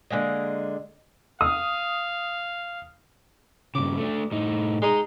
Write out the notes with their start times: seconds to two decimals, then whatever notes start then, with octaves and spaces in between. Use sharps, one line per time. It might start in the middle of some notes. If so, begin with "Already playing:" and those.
0.10 D3 G#3 A#3 D#5
1.41 F5 D#6
3.75 G2 C#3 D6
3.98 A3 D4
4.32 A2 D#4
4.82 G#3 D#4 D#5